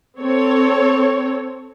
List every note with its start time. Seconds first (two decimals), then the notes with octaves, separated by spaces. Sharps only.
0.20 C4 A4 C#5